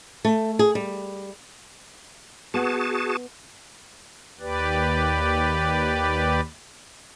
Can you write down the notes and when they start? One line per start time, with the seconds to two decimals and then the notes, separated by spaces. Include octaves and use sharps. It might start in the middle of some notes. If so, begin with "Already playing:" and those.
0.25 A3
0.59 G#4
0.75 G3
2.54 B3 F#4 G#4 F#5 A5
4.40 D#2 G4 B4 D5